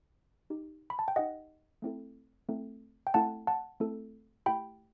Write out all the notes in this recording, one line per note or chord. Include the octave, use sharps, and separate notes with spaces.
D#4 G4
B5
A5
G5
D#4 G4 D#5 F#5
A3 C4 E4 A4
A3 C4 E4 A4
G5
A3 C4 E4 A4 F#5 A5
F#5 A5
A3 C4 E4 A4
A3 E4 G4 G5 B5